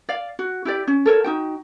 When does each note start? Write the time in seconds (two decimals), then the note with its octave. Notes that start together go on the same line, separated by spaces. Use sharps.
0.09 D5 F5
0.39 F#4
0.65 E4 G4 D5
0.87 C#4
1.06 A4 A#4 C#5
1.24 D#4 F#4 G5